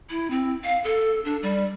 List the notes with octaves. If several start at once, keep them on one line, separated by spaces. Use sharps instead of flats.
E4
C4
F5
A4
D4
G3